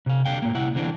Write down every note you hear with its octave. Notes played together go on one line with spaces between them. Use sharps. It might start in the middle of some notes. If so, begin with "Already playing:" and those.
C3 F5
D3 G3 F5 G5
A2 A#3
C2 E4 F#5
D3 E3 C4 D4